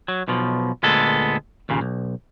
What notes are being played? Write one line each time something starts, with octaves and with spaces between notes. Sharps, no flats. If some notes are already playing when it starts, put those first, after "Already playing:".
F#3
B1 B2 F3
D2 A#2 G#3 B3 A4
D#2 A#2 C#3
B1